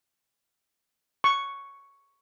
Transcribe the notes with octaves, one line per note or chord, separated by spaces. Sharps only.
C#6